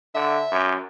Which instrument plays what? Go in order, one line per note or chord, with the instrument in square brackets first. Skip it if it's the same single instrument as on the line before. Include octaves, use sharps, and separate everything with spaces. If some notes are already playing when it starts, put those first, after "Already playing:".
[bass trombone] D3 [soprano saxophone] E5
[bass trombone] F#2